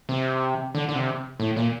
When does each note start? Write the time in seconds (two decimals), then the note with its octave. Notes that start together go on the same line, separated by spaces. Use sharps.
0.09 C3
0.75 D3
0.89 D3
0.95 C3
1.40 A2
1.56 A#2